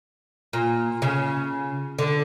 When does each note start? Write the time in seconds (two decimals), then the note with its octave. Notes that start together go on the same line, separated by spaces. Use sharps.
0.53 A#2
1.02 C#3
1.98 D3